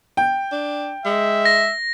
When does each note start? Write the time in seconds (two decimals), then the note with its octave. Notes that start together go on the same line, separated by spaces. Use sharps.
0.17 G5
0.52 D4
1.05 G#3 E5
1.46 A#6